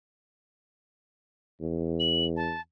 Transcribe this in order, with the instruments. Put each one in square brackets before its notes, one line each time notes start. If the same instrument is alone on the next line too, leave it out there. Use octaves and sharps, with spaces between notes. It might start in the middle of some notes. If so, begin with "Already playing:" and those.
[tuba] E2
[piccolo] F#7
A5